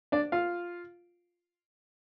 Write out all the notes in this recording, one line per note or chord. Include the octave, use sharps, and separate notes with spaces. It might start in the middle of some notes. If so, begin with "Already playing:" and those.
D4 D5
F4 F5